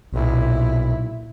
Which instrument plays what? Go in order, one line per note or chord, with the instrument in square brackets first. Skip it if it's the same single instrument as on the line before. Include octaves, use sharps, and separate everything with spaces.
[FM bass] B1 [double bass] A#2 E4